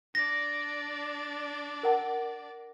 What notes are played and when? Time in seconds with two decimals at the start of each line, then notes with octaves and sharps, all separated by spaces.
0.15 D4 D5 A#6
1.83 A#4 F#5 A5